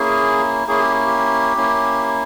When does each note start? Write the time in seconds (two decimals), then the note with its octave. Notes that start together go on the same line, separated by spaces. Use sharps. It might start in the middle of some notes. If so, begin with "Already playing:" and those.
Already playing: A#3 C#4 E4 G#4
0.67 A#3 C#4 E4 G#4
0.80 G4
1.06 G4
1.57 A#3 C#4 E4